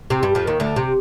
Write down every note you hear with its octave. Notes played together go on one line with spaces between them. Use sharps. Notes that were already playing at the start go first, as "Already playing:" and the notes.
C3 C4
G2 G3
F2 F3
D#2 D#3
D2 D3
C3